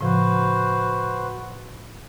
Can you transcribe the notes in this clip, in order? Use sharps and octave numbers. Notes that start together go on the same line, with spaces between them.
A2 C#3 F3 F#4 B4 C5